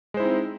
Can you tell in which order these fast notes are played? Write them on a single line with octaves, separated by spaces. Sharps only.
G#3 C5 E4 D#4 C4